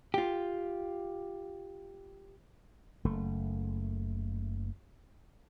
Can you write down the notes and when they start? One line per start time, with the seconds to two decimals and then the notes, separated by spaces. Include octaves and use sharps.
0.14 F4 G4
3.05 F#1 A3